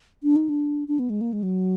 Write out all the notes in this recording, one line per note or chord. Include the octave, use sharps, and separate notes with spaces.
D4
D#4
D4
D4
B3
G#3
A#3
G#3
F#3